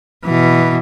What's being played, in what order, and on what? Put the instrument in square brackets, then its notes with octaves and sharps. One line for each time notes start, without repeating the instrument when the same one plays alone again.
[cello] B2 E3